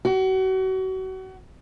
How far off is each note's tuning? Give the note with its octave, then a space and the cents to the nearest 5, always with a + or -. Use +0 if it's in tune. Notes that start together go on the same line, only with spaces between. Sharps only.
F#4 +35